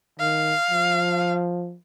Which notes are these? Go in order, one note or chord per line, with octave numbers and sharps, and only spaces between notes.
D#3 F5
F3